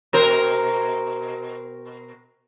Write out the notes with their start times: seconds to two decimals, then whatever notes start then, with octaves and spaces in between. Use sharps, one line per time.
0.13 B2 A#4 C5